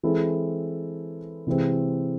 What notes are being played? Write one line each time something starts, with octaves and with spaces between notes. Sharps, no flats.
E3 G#3 C4 E4 A4
C3 E3 G#3 C4